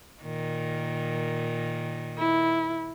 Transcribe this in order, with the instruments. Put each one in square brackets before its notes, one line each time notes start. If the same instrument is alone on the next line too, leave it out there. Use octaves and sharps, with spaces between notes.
[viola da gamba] A#2 D#3
[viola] E4